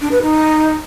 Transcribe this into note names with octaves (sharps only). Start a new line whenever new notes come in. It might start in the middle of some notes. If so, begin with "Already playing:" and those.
D4
B4
D#4